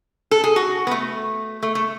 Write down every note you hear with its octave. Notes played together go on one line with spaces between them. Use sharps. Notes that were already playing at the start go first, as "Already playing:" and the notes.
A4
G#4
F#4
B3
A3
A3
A3